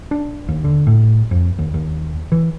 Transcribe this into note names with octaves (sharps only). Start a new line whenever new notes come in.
D4
D#2
D3
A2
F2
D#2
D#2
E3